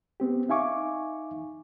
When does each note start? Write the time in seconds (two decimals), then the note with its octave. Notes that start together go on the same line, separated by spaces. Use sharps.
0.20 B3 C4 G4
0.49 D#4 E5 F5 G#5 C#6 D6